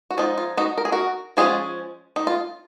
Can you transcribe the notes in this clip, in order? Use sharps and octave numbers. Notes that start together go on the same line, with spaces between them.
F#4
F3 G#3 D#4 F4
F4
D#4 F#4
A#4
G#4
F#4 A#4
F3 G#3 C#4 F4 G#4
D#4
F4